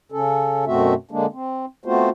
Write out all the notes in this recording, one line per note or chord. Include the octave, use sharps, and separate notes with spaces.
C#3 C#4 A4
F#2 B2 A3 C4 F#4 E5
D3 G#3 A#3 D4
C4
A3 B3 C4 F4 F#4 C5